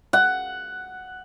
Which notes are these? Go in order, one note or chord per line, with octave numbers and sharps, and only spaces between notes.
F#5